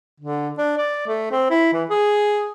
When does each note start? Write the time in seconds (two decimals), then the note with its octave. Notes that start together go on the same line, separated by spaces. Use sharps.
0.20 D3
0.58 D4
0.78 D5
1.07 A3
1.31 C4
1.50 E4
1.73 E3
1.89 G#4